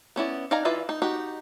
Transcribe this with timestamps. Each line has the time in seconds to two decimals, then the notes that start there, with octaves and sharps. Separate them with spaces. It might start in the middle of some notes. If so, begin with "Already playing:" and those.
0.16 B3 C#4 E4 D5
0.51 D#4 D5 F5 G#5 A#5
0.65 E3 F4 B4 D5 E5
0.89 D#4
1.02 D#4 F#4 G4